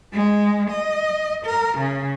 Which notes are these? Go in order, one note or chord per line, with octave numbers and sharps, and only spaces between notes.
G#3
D#5
A#4
C#3